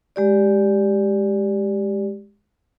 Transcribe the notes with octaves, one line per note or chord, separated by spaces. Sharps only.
G#3 G4 D5